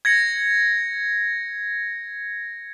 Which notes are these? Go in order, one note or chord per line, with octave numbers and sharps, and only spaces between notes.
G#6 A#6 C#7